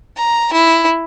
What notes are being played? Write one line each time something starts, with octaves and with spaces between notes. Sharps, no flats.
A#5
E4